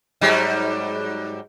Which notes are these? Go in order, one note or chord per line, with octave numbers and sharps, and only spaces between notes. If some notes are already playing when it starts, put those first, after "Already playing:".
G#2 F#3 G3